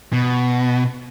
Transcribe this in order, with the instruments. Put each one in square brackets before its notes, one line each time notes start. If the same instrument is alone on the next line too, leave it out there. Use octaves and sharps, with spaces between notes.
[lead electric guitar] B2